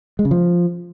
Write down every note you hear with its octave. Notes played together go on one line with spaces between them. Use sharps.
G#3
C#3
F3